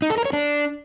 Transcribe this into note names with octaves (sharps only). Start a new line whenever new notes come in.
D#4
A4
A#4
C#5
D4